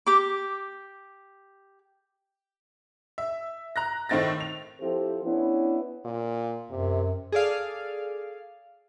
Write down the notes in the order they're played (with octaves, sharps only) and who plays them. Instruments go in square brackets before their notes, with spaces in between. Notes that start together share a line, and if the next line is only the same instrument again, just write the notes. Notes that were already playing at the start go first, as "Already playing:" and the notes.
[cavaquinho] G4 D6
[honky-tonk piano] E5
A#5 F#6 A#6
A2 D#3 A3 C4 A6 A#6
F7
[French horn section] F3 C4 E4 G4 A4 C5
B3 C#4 D4 E4
[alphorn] A#2
[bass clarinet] F#2 [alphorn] C3
[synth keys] G#4 A4 D5 F5